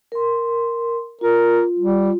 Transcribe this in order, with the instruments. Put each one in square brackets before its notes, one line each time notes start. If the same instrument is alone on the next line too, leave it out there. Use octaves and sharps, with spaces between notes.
[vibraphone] A#4 C6
[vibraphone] F4 [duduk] A#4
[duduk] G3